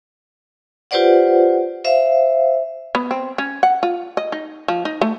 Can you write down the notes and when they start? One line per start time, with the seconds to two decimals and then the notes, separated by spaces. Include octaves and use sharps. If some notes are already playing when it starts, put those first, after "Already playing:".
0.91 F4 G4 B4 C5 D5 F#5
1.85 C5 E5 F5
2.95 B3
3.11 C4
3.38 C#4
3.63 F#5
3.83 F4
4.17 D#5
4.32 D#4
4.68 F3
4.85 D#4
5.01 A3